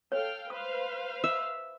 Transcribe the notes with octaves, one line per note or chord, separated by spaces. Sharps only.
A4 C#5 F5 G5
B4 C5 F5 D#6
E5